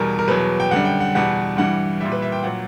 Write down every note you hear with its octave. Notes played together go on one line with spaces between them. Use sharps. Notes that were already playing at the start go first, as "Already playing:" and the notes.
Already playing: E2 B2 G3 A#4
A#4
E2 B2 F#3 B4
G5
F#2 D3 G3 F#5
G5
F#5
E2 B2 G3 F#5
G2 E3 G3 F#5
A#2 G3 E5
B4
E5
G5
A#2 F#3 F#5